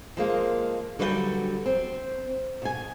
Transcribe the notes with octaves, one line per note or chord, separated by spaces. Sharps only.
F3 G#3 A#3
D3 F#3 G3 B4 C5 G5
C4
B2 G#5